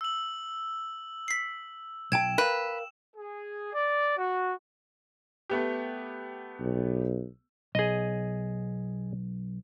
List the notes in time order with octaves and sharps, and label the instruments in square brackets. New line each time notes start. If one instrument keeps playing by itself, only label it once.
[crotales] E6 F#7
[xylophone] B6 C7
[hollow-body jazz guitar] B1 A5 [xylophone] G5 G#6 [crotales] E7
[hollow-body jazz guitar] A#4 F5 [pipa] B4
[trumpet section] G#4
D5
F#4
[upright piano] A3 B3 G4
[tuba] B1
[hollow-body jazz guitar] B1 [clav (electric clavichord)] G#4 D#5